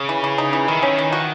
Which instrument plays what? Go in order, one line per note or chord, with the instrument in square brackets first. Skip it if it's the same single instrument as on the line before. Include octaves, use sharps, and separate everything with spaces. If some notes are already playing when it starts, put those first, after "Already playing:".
Already playing: [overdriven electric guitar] C#3
[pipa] E3
E3
D#4
E3
[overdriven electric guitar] D#3 [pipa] E4
[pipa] C#4
E3
F#4